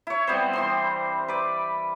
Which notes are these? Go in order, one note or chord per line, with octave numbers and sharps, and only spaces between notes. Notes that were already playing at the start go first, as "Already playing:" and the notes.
E4 C#5
G3 B3 C4 C5
E3 C4 C6
B4 D5